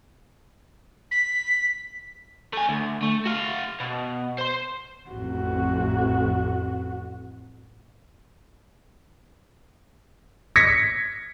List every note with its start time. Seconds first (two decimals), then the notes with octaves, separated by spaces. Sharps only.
1.11 B6
2.53 A3 G#5
2.69 D2
3.03 A3
3.26 F#4 F5
3.80 B2
4.38 C5 C6
5.10 A1 F2 F#4
10.56 G#6 A#6 B6 C#7